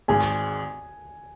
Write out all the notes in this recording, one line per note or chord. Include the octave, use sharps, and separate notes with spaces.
G#1 G#2 G#3 G#5